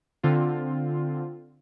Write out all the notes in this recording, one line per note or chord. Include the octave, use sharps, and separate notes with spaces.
D3 C4 F4